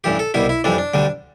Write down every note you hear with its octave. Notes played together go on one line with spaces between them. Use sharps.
A1 G2 E3 G4
A4
C2 B2 G3 E4
E4
F2 E3 G3 D4
D4
D2 D3 G3